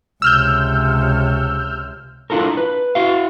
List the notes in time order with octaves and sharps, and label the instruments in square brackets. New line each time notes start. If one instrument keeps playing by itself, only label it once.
[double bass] C#2 C3 [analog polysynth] E6 F6 G6
[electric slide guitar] D4 E4 F4 A4 A#4
B4
E4 F#4 F5